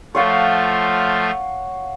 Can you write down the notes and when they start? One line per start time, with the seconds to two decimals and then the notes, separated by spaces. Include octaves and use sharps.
0.15 F3 A3 F4 C#5 F5 F#5